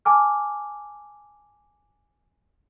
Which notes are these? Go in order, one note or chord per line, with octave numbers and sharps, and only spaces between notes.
G#5 A5 D6 F6